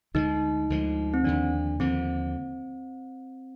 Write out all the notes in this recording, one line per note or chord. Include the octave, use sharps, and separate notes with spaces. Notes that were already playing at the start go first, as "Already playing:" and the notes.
D2 D3 F3 G#3 D#4
D2 D3 F3 G#3
C4
D#2 D3 F3 D4
D#2 D3 F3 C4